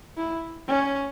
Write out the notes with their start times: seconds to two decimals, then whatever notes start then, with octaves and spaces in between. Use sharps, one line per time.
0.17 E4
0.67 C#4